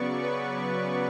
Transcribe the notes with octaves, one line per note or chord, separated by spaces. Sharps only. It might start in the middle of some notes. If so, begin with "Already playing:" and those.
Already playing: C#3 F#3 B3 D5 C#6
B4